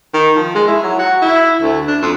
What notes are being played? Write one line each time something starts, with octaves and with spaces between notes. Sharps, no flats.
D#3
F3
G#3
E4
F#3
F#4
E4
D2
D4
F2